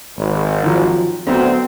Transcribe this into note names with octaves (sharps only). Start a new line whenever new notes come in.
G#1
D#3 F3 F#3
D2 F#3 B3 C4